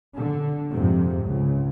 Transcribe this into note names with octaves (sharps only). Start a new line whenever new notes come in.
D3
F2 G#2 C3
C#2